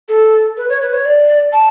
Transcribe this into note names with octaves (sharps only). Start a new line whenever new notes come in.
A4
B4
C#5
B4
C#5
D5
A5